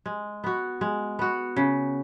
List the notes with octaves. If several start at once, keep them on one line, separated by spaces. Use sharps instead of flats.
G#3
B3 F#4
G#3
B3 F#4
C#3